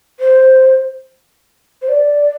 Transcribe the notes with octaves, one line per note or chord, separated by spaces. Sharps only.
C5
C5
D5